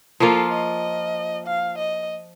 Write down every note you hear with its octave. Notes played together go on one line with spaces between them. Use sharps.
F3 A#3 F4 A4
D#5
F5
D#5